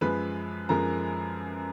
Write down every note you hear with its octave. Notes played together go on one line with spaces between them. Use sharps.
F#2 F3 G#3 B4 B5
F#2 F3 G#3 A#4 A#5